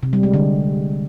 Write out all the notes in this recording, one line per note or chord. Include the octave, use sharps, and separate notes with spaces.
C3
G3
G#3
D3